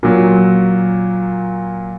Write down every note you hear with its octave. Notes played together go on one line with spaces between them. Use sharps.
A#2 F#3